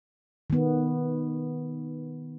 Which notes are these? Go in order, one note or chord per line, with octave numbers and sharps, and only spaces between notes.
D#3 B3